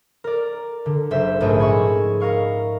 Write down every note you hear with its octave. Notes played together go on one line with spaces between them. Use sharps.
A#4 D5
D3
F#1 C5 E5
A#1 G#2 A3 G#4
D#5 G#5 B5 C#6 E6
A#4 D#5 F5 C#6